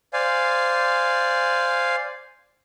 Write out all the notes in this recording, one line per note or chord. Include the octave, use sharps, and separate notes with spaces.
C5 D5 F5 G#5